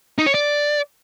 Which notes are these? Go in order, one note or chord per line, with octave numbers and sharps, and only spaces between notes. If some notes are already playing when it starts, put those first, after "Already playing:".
D#4
C#5
D5